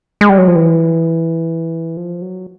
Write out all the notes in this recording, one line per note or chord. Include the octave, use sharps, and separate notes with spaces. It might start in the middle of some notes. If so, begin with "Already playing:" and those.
G#3
G3
F#3
F3
E3
F3
F#3